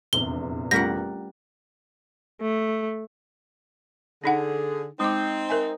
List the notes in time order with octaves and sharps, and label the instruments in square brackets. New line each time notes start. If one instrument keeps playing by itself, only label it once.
[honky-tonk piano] F1 A#1 E2 [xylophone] G7
[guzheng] G3 A#4 F#5 [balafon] A3 C#4 F4 [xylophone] A#6
[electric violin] A3
[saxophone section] D3 G#4 [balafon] D4 D#4 F#5
[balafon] G#3 D6 [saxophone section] C4 D#4
[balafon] A#4 E5 G#5